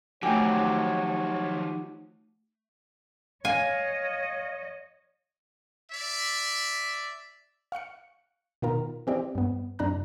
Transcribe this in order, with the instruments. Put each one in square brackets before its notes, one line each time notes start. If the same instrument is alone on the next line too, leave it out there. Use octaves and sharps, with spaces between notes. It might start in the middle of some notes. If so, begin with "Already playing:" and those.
[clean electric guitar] D#3 F#4 G4 [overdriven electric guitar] F3 F#3 [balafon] A3 G#5 [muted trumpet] C#5
[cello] C#5 D#5 [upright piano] F5 [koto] G#5
[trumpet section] D5 E5
[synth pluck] F5 C#6 F#6 C#7
B2 D#3 F4 A#4
E3 C4 G4 D5
G2 B3
F#2 C3 D4 A#5 F#6